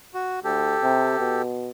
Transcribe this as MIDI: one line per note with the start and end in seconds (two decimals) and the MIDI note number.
0.14 0.40 66
0.44 0.76 38
0.44 1.42 67
0.44 1.42 69
0.83 1.17 48
1.19 1.71 47